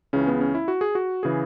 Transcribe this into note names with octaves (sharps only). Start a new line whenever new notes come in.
C#2 C#3 E3 C#4
B3
C#4
E4
F#4
G#4
F#4
C#3 E3 G#4